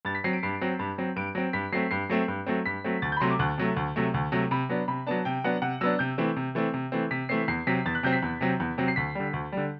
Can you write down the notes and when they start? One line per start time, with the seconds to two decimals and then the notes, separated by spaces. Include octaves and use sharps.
0.05 G2 A6
0.15 B6
0.24 F#3 C4 C7
0.33 D7
0.43 G2 C7
0.61 F#3 C4
0.79 G2
0.98 F#3 C4
1.16 G2 D7
1.35 F#3 C4
1.53 G2 B6
1.72 F#3 A3 C4 C7
1.91 G2 C7
2.09 F#3 A3 C4
2.28 G2
2.46 F#3 A3 C4
2.66 G2 B6
2.84 F#3 A3 C4
3.02 D2 A6
3.12 G6
3.17 B5
3.20 C3 F#3 A3 C6
3.31 D6
3.39 D2 F#6
3.58 C3 F#3 A3
3.76 D2
3.96 C3 F#3 A3
4.14 D2
4.32 C3 F#3 A3
4.51 C3 B5
4.69 F#3 B3 D4
4.88 C3 B5
5.07 F#3 B3 D4 A5
5.25 C3 G5
5.44 F#3 B3 D4 F#5
5.62 C3 F#5
5.81 F#3 B3 D4 E6
5.99 C3 G6
6.18 E3 A3 C4
6.36 C3
6.55 E3 A3 C4
6.74 C3
6.92 E3 A3 C4
7.11 C3 B6
7.29 E3 A3 C4 C7
7.48 E2 C7
7.67 C3 F#3 C4 B6
7.86 E2 A6
7.95 F#6
8.03 C3 F#3 C4 G6
8.13 B6
8.23 E2
8.41 C3 F#3 C4
8.60 E2
8.78 C3 F#3 C4
8.88 C7
8.96 D2 B6
9.15 D3 G3
9.33 D2
9.52 D3 G3